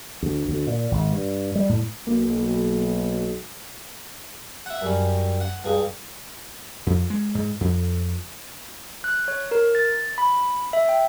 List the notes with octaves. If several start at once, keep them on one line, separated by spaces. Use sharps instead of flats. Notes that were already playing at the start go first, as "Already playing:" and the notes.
D2
D2
A#2
G#1
G2
G3
A2
B1 A#3
E5 F#5
F#2 G3 C#4
F#5
C#2 G2 G#4
F2
G#3
G#2
F2
F#6
C#5
A#4
A6
B5
E5
G5